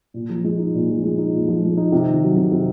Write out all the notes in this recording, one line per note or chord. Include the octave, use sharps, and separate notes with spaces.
A#2
F3
G#3
D#4
A#2
F3
G#3
D#4
A#2
F3
G#3
D#4
C3
D#3
F#3
C3
C3